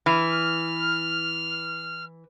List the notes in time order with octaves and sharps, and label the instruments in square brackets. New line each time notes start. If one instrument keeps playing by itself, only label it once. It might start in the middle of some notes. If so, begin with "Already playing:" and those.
[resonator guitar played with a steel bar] E3 [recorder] F6